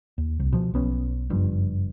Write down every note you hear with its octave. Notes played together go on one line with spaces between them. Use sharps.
D#2
C2
B2 F3
B1 B3 C#4
F#1 G2 F3